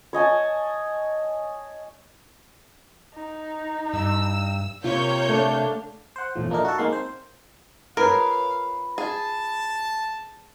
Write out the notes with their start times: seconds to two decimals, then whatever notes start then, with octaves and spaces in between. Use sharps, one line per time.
0.13 C#5 D#5 G#5 A5
3.14 D#4
3.93 G2 E6
4.84 C3 A#3 F4 C#5 F5 G6
5.29 A3 D4 F5
6.16 C5 F#5
6.35 A#1 E2 A2 F3
6.50 A3 A#3 D4 D#4 A#4
6.65 F#4 A4
6.78 D#3 G#3 A#3 F5 C6
6.92 C4 C5
7.97 F4 G#4 A#4 B4 C#5 F5 B5
8.98 G#4 A5